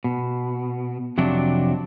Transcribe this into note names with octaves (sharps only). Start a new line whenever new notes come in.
B2
F2 C3 F#3 D4